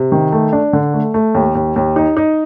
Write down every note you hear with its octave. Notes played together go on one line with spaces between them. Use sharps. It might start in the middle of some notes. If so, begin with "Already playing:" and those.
Already playing: C3
D#3
A3
D4
D3
A3
A3
D#2
D#2
D#2
D#4
D#4